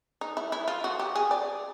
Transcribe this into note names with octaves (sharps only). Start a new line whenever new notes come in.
D#4
E4
E4
F4
F#4
G4
G#4
D5